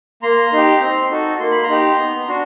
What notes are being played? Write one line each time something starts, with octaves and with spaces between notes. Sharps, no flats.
A#3 A#5 C6
D#4 G4
C4
D#4 F#4 A4
A#3 C6
B5
A#5 C6
D#4 G4
B3
D4 F#4